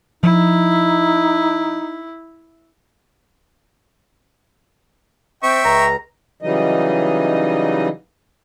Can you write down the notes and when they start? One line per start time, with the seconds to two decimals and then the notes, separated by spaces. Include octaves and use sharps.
0.23 F3 D#4 E4
5.43 C4 E5 G5 C#6
5.64 C#2 A#5
6.42 C#3 E3 F#3 G3 D#4 D#5